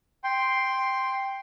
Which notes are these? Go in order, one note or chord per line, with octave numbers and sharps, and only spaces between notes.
G5 C6